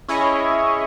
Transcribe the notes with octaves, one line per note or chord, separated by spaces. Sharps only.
C#4 E4 G#4 C#5 D#5